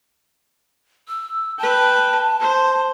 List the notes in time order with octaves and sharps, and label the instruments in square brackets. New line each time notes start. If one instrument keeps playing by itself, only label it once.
[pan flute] E6
[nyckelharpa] B4 G5 [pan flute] A5
[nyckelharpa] C5